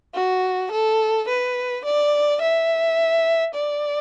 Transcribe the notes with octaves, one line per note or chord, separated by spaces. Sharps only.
F#4
A4
B4
D5
E5
D5